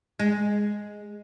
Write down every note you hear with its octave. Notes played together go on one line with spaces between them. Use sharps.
G#3